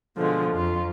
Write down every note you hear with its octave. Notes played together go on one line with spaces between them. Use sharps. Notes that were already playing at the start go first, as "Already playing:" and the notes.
B2 D3 F3 G#3
F2 F4